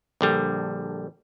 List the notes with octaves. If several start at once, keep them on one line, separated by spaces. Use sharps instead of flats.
A#1 D3 G3